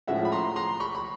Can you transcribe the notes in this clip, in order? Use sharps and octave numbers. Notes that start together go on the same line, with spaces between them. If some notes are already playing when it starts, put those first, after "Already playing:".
A2 F3 G#3 C#4 E5 F#5
B5
A#5 C6
A#5 C6
B5 C#6
B5